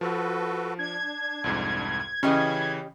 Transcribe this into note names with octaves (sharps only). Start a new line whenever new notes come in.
F3 F#4 A4 B4
D4 G#6
C2 F2 G#2
C#3 E3 C#4 G4 D#5 B5